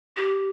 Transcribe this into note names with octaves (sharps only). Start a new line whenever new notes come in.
G4